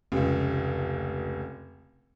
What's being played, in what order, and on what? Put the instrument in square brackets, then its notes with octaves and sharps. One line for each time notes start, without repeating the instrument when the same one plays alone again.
[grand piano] F1 C#2